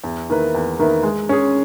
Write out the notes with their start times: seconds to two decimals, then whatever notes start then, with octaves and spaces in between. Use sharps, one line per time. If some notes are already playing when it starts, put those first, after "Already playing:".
0.04 E2
0.30 D#3 A#3 E4 B4
0.55 E2
0.79 D#3 A#3 E4 B4
1.03 G#3
1.29 C#4 G#4